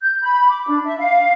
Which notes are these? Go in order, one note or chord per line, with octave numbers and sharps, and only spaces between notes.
G6
B5
D6
D4
E5
F5